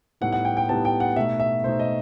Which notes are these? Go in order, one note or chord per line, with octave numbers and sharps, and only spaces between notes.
A2 G3 B3 D#4 F#5
F#5
G5
G5
A2 G3 B3 D#4 A5
G5
F#5
B2 A3 D#4 E5
E5
B2 A3 D#4 C5
D#5